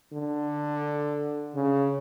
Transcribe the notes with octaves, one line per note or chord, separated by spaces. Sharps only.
D3
C#3